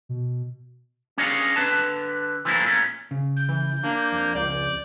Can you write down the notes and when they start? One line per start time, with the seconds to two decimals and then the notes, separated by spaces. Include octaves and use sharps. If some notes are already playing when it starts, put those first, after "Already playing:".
0.09 B2
1.18 C#4 D4 G#4 C#5 D#5 F5
1.56 D3 D4 B4 A5
2.45 E3 F3 A3 A#3 D4 E4
2.64 A#2 A3 C#4
3.11 C#3
3.37 G6
3.49 E3
3.84 A#3 D4
4.12 F2
4.35 C#2 D5